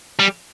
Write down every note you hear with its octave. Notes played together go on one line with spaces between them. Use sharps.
G3